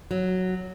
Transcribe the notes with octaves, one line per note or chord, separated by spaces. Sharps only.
F#3